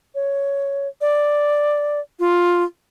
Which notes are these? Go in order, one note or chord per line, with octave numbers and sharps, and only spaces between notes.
C#5
D5
F4